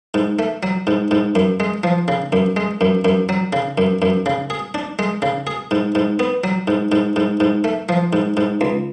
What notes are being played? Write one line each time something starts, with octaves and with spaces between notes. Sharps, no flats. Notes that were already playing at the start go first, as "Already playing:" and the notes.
G#2
A3
F#3
G#2
G#2
F#2
G#3
F3
C#3
F#2
G#3
F#2
F#2
F#3
C#3
F#2
F#2
C#3
G#4
D4
G#3
C#3
G#4
G#2
G#2
B3
F#3
G#2
G#2
G#2
G#2
A3
F3
G#2
G#2
C#2